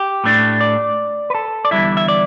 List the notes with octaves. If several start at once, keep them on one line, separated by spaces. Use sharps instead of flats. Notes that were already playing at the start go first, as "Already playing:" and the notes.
Already playing: G4
A2 A3 D4
D5
B4
A4
D5
E2 D3 G3 E4 E5
E5
D5